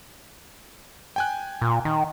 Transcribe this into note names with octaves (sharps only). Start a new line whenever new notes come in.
G5 G#5 F#6
A#2
D#3